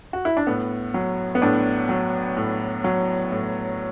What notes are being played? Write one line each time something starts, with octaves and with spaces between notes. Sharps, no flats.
F#4
E4
D4
A2 B3
F#3
B3
A2 D4
F#3
A2
F#3
A2